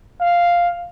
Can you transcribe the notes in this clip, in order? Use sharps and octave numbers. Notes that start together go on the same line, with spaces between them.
F5